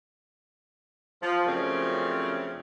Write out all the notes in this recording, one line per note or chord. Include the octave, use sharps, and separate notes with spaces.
F3
F#2 C#3 F3 A3 C4 D4